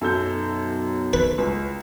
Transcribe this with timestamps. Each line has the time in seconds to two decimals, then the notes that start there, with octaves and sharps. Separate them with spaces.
0.01 B1 F#2 A4 G6
1.13 B4
1.38 C#2